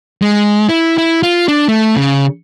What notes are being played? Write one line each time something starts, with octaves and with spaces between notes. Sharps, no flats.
G#3
E4
E4
F4
D4
A3
C#3